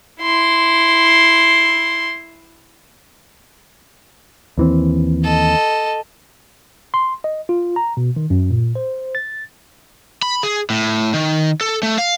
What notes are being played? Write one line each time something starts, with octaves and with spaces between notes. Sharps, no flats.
E4 C6
D#2 E3 C4
A4 D#5
C6
D#5
F4
A#5
B2
D#3
F#2
A#2
C5
A6
B5
G#4
A2
D#3
A4
A3
F5